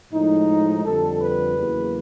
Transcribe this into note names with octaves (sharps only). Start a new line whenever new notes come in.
A2 F3 G#3 D#4
F2 D3 G3 A4
B4
E2 C#3 F#3 A#3